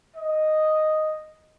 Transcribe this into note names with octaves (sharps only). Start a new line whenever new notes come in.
D#5